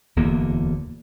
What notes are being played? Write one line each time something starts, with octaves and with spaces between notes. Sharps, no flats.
D1 E2 D3 A#3